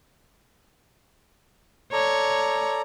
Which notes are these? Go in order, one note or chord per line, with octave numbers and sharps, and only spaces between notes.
A4 C#5 D5 A#5